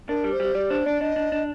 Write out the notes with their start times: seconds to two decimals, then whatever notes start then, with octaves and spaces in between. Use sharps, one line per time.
0.09 D4 A#4
0.24 G3
0.33 C5
0.40 G3
0.55 G3 D5
0.70 D4 C5
0.86 D4 D5
1.01 D4 D#5
1.16 D4
1.32 D4